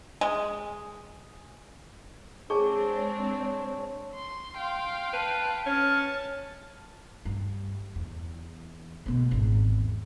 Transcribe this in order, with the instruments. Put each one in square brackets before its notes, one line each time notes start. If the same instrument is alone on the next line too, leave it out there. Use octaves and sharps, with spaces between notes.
[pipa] G#3
[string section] G#3 C4 D4 [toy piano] G#4 [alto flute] C#5 [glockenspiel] G#5 A5 C#6
[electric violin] C6
[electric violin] F5 G5 [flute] C6
[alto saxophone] B4 [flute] A5
[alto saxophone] C#4 [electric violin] A5 [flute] F6
[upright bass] G2
E2
B2 D3
G#1 E2